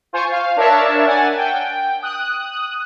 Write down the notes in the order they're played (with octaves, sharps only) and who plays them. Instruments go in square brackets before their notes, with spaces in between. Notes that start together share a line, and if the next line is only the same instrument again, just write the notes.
[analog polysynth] F4 C5 G#5 C#6
F5
D4 A#4 C#5 E5 A5
F#5 G#5 A6
G5
D#6 F#6